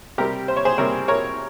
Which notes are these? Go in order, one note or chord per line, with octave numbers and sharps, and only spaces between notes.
C3 G3 C4 G4 A#4
C5
C#5
G#4 C5
C3 G3 C4 A#4 C#5
A#4 C#5